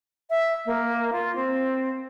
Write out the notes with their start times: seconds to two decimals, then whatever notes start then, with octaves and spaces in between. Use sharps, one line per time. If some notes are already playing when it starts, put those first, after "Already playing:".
0.30 E5
0.66 A#3
1.12 F4
1.36 C4